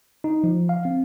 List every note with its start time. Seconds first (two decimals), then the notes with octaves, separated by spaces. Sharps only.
0.24 D#4
0.44 F3
0.69 F5
0.85 C4